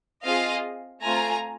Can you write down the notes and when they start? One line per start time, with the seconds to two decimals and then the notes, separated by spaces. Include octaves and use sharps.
0.25 C4 F4 G#4 D#5 F5
1.03 A3 C4 F4 G#5 A#5